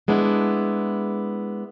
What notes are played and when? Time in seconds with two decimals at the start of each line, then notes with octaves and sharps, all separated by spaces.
0.08 G#3 B3 D4 E4